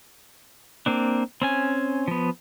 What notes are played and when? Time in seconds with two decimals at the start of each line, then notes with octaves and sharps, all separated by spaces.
0.86 A#3 C4 D4
1.42 C4 C#4 G#5
2.08 F3 B3